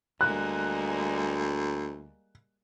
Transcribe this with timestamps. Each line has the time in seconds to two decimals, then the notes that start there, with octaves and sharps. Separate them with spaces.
0.21 D2 G3 G#3 A#3 F#6